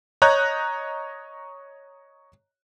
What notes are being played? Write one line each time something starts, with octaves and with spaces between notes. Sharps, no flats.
C#5 D#5 A#5 F#6 G6